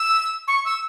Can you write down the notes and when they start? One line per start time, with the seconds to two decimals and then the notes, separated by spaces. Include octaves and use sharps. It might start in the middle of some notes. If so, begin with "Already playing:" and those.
Already playing: E6
0.48 C#6
0.65 E6